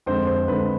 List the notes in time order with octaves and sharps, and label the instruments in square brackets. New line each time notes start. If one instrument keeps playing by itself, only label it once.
[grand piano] F2 D3 G#3 C5
C5
F2 D3 G#3 B4